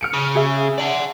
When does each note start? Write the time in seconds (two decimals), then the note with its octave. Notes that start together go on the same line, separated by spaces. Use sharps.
0.01 F6 C#7 D7
0.14 C#3
0.35 G#4 E5
0.78 D5 F#5